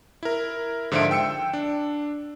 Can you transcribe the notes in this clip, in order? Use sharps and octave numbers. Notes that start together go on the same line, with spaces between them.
E4 A#4
G#2 D3 F3 F4 E5 D7
G5 E6 C#7
D4